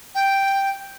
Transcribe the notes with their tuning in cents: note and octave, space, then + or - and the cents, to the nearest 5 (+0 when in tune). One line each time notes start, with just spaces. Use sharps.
G5 +0